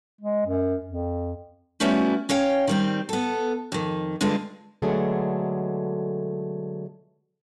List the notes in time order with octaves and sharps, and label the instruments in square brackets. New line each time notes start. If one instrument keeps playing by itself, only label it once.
[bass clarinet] G#3
F#2
F2
[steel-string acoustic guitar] G3 A3 B3 C#4 E4 F#4
C#4 C#5 F5 G5
D#3 G3 C4
B3 A4
F2 D#3
G2 D3 G#3 F4
B2 D3 F#3 G#3 A3 G#4